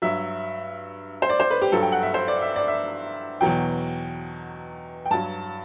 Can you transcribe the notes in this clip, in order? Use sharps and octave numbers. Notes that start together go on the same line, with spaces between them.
G2 F#3 E5
C5
D5
C5
B4
G4
G2 F#3 A4
G5
F#5
E5
C5
D5
E5
D5
E5
E2 B2 F#3 G5
G5
G2 F#3 A5